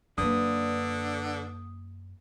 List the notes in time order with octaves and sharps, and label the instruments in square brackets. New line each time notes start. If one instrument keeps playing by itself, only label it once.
[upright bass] F#2 A#3 [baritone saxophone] D3 [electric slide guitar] D4 B4 [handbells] D#6